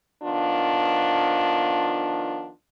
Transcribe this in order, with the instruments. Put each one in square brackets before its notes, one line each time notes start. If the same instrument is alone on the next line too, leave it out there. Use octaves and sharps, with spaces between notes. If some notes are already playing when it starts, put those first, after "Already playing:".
[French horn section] D#3 F3 B3 D4 F4